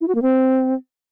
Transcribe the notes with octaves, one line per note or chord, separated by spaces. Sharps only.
E4
F#4
A#3
C4